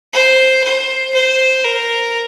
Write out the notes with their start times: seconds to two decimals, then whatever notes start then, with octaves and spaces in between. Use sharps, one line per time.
0.13 C5
0.64 C5
1.14 C5
1.64 A#4